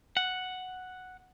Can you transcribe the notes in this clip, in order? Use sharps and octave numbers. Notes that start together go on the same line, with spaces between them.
F#5